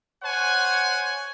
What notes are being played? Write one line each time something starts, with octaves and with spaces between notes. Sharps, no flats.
C5 C#5 F#5 G#5